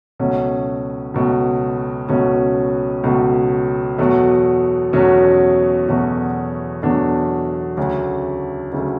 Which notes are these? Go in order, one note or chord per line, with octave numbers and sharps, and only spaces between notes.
C#2 B2 F#3 A3 C#4
C#2 B2 F#3 A3
C#2 B2 F#3 A3 C#4
C#2 B2 F#3 A3
E2 B2 F#3 A3
E2 B2 F#3 A3 C#4
E2 B2 F#3 A3
E2 B2 F#3 A3 D4
D2 C#3 F#3 A3
D2 C#3 F#3 A3